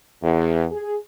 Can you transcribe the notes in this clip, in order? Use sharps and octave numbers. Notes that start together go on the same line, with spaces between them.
E2
G#4